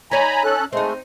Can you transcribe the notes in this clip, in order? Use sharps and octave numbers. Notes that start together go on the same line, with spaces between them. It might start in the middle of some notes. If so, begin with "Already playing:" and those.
D#4 C#5 D5 G#5 A#5 B5
C#4 A4 F#6
G#3 A3 C4 D#4